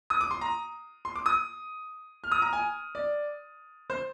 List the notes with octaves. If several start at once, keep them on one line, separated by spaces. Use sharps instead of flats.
D#6
D6
C6
A#5
C6
D6
D#6
F6
D#6
A#5
G#5
D5
C5